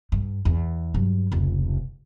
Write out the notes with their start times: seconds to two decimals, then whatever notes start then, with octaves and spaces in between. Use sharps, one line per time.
0.12 G2
0.45 E2
0.94 G2 F#3
1.32 F1 C#2